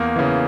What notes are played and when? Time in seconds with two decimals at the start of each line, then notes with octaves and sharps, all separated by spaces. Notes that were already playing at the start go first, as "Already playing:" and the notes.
Already playing: E2 A#3
0.16 C#3 E3